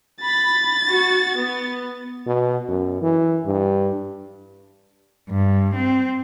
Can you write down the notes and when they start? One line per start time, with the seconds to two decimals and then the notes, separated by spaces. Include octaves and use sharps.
0.22 B5 A6
0.89 F#4
1.37 B3
2.27 B2
2.68 F#2
3.02 E3
3.45 G2
5.30 G2
5.75 C4